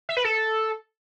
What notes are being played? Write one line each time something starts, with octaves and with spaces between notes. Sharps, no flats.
E5
B4
A4